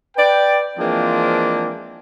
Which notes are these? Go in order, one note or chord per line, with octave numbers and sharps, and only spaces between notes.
B4 D5 G5
E3 F3 G#3 A#3 C4 D4